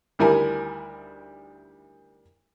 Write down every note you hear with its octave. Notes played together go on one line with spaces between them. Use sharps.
D2 D#3 G3 E4 A#4 G#5